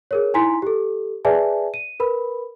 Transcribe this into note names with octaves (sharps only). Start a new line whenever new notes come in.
G#4 A#4 C#5
D#4 E4 G#5 A#5 C6 B6
G4 A4
G#4 B4 D5 E5 G#5 A5
D#7
A#4 B4 B5